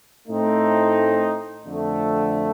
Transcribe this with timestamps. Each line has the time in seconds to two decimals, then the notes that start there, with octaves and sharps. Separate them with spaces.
0.28 A2 A3 C4 D#4
1.65 F2 D3 A3